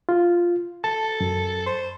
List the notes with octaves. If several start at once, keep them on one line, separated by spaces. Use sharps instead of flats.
F4
A4 A5
F#2
C5